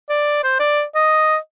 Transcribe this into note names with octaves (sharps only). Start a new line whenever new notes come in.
D5
C5
D5
D#5